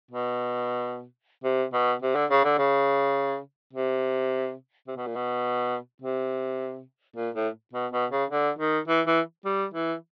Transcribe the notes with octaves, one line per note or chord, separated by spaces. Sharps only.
B2
C3
B2
C3
D3
C#3
D3
C#3
C3
C3
B2
A#2
B2
C3
A#2
A2
B2
B2
C#3
D3
D#3
E3
E3
G3
E3